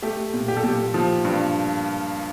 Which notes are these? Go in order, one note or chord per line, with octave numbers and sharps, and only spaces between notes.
A3 G4
A#2
G4
A4
A#2 G4
F3
G2